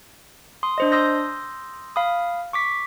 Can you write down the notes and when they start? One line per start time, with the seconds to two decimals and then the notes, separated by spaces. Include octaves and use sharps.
0.63 C6 D#6
0.78 D4 C5 D#5
0.92 C6 D#6 E6 G6 A#6
1.96 F5 B5 D#6
2.53 C#6 D6 B6